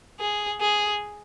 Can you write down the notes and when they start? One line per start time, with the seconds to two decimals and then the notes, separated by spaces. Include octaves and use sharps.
0.20 G#4
0.61 G#4